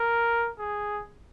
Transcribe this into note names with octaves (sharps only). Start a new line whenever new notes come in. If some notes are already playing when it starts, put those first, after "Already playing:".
Already playing: A#4
G#4